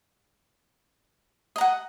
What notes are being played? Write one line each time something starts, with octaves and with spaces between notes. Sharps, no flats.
D#5 F#5 A#5